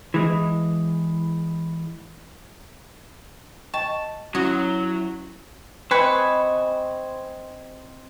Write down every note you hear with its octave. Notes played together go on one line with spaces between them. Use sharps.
E3 G#3
D#5 G5 A5 C#6
F#3 C#4 E4 F#4 D#6 G#6
C4 B4 C5 D#5 G#5 C#6